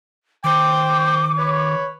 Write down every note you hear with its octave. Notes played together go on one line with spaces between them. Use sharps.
D#3 C5 G5 D6
B4 C#5